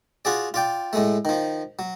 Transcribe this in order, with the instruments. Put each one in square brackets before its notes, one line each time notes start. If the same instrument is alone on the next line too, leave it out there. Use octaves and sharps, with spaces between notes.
[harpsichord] F4 F#4 G#4 D5
F4 D5 G5
A2 G#3 A3
D#3 F3
F#3